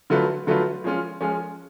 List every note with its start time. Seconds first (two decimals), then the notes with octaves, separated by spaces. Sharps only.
0.10 D3 F#3 A3 F4 B4
0.47 D3 F#3 A3 F4 B4
0.84 F3 G#3 C#4 F4
1.21 F3 G#3 C#4 F4